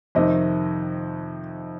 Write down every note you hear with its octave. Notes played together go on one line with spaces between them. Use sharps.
F2 C3 D#3 D#5